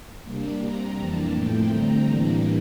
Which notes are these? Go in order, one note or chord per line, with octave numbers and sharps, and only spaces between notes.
C3 G3 A#3 D4
C3 G3 C4 A#5
F2 E3 A#3 D4 A5
A2 F3 A3 C4 G5
D3 G3 C4 A#5
A2 E3 G3 A#3 D4